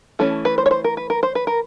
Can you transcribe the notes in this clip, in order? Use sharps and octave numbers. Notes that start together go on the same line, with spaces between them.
E3 A3 C#4 A4
B4
C5
C#5
C5
A#4
B4
A#4
C5
B4
A#4